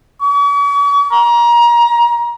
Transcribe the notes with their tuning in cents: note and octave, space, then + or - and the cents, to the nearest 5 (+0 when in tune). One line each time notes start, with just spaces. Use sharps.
C#6 +45
A#5 +25